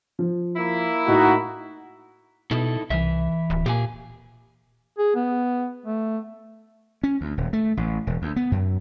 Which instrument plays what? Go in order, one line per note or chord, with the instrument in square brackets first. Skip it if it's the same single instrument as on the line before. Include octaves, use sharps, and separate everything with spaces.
[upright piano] F3
[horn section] A#3 E4
[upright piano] A2 [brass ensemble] D#4 F#4
[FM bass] B2 [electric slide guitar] D#4 E4 A4
[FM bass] C2 [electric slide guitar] E3 E5
[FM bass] D1
[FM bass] A#2 [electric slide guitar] G4 F5 G#5
[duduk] G#4
B3
A3
[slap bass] C#4
D2
D#1
A3
A1
E1
D2
B3
F#2